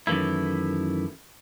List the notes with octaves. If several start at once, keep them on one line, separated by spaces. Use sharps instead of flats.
F#2 D#3 E3 A3 E4